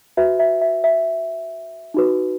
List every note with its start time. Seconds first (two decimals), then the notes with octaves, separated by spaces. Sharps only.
0.17 F#4 B4 E5
0.39 E5
0.62 E5
0.84 E5
1.94 D#4 F#4 B4